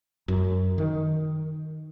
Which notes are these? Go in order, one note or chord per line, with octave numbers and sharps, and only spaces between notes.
F#2
D#3